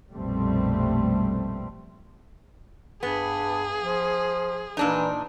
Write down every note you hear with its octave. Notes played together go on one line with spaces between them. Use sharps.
A#1 F2 B2 G3 A3 C4
G2 B3 G#4
F3
A#2 E3 D4 D#4